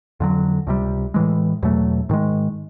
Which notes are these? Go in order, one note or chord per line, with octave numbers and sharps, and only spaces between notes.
F2 D3 F#3
C#2 C3 E3 G3
A2 E3 G#3
E2 B2 F#3 A3
G#2 D#3 G#3